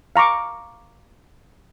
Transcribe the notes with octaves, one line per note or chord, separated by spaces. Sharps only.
F5 A#5 C#6 D6